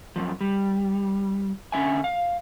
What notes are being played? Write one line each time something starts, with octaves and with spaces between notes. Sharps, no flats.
F#2 A#2 F3
G3
D3 C#4 E5 G#5
F5